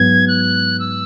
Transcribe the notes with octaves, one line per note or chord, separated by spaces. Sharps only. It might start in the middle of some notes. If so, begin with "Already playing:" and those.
Already playing: G#2 F#3 B3 G#6
F#6
E6